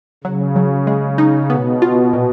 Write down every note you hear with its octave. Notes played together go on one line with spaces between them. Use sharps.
C#3 F#3
F#3
G#3
D#4
B2 B3
F4
A#2